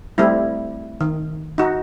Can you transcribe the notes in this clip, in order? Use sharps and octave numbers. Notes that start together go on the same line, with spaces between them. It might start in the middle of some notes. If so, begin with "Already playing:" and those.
G3 A3 C4 E4
D#3
D#4 F#4